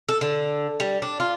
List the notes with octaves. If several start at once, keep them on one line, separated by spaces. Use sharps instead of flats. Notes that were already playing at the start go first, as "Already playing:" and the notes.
A4
D3
G3
D4
F4